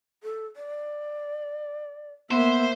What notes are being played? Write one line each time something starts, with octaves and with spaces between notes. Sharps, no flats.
A4
D5
A#3 B3 C5 E5